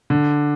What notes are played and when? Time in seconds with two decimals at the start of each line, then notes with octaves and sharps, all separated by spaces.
0.10 D3